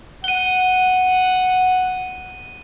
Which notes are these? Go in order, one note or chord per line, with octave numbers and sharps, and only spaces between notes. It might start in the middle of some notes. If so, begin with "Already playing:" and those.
F#5 D#7 G7